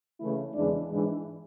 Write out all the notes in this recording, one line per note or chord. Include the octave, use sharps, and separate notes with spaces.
C#3 E3 A3 E4
E2 C#3 E3 G#3 D4
G#2 E3 G#3 D4